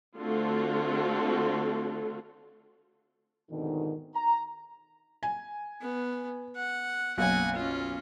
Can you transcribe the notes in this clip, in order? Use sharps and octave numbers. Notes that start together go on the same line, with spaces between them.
D3 A3 C4 F4 F#4 A4
F2 G#2 B2 D3 D#3
A#5
G#5
B3
F#5
F#1 B1 F#5 G#5
C#4 F4